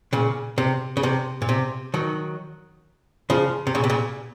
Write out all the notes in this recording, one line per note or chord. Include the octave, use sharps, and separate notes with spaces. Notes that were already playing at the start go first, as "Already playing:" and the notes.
A#2 C#3
C3
C#3
C3
A#2
C3
D#3 F#3
C#3 F3
C3
A#2 C#3
C3
A#2 C#3